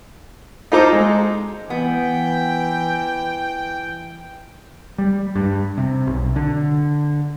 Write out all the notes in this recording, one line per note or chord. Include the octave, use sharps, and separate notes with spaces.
D#4 F4 A4 C5 A#5 D6
G#3
E3 B3 G5
G3
G2
C3
B1
D3